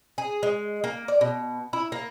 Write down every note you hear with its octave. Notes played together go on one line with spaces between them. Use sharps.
G#4
G#3
A#3
D5
B2
E4
A#3